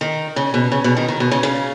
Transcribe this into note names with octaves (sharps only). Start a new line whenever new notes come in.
D#3
C#3
B2
C#3
B2
D#3
D#3
B2
C#3
C#3